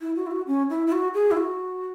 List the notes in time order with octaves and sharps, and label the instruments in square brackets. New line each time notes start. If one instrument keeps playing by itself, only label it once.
[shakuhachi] E4
F#4
E4
F#4
C#4
E4
E4
F#4
G#4
E4
F#4